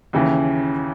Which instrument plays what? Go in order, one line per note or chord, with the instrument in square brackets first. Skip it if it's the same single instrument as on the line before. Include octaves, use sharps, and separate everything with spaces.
[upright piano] D#2 C#3 E3